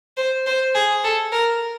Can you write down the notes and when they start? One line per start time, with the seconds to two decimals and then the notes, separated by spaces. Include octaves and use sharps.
0.17 C5
0.46 C5
0.74 G#4
1.04 A4
1.32 A#4